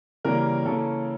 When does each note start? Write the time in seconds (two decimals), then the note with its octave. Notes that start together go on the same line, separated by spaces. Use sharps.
0.25 C#3 E3 G3 A#3 C#4 A#4
0.65 C#3 E3 A#3 C#4 A4